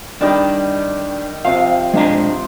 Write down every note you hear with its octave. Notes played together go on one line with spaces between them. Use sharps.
D#3 G3 D4 D#5
C3 F3 F5
G#3 D4 A#5